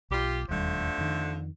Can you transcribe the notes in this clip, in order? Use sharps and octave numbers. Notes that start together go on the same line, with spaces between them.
B1 F4 G4
E1 D#2 D3 F3 G3 A3
F2 D#3